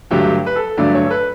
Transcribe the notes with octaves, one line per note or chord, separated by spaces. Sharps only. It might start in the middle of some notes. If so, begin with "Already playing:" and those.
G2 D3 F#3 A3 G4
B4
A4
G2 D3 F#3 A3 D5
C#5
A4
B4